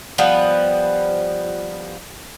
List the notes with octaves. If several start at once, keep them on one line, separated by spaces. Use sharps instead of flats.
F3 G3 B3